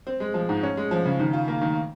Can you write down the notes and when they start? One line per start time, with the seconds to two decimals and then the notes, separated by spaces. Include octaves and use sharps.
0.07 C4
0.20 G#3
0.34 F3
0.49 G#2
0.63 C#4
0.77 G#3
0.91 F3
1.05 C#3
1.20 D#3
1.33 F4
1.48 A#3
1.61 D#3